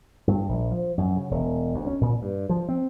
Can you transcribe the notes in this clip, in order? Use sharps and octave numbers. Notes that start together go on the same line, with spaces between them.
G2
A#1
F3
F#2
C#3
E1
D2
C#4
A#2
G2
F3
C4